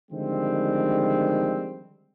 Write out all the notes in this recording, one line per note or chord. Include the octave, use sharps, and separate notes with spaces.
D3 D#3 F3 G3 G#3 C4